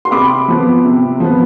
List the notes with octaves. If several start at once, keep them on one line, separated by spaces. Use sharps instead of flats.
C6
C3 B5 D6
F3 B3
C3
F3 B3